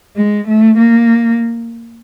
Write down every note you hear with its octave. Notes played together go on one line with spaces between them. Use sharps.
G#3
A3
A#3